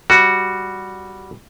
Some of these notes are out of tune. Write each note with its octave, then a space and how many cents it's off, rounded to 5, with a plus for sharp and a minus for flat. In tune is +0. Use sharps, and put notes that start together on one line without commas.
G3 +0 F#4 +0